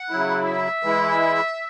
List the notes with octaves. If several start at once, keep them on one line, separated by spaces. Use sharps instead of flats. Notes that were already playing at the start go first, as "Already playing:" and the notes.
Already playing: F#5
C#3 F#3 E4
E5
E3 G#3 E4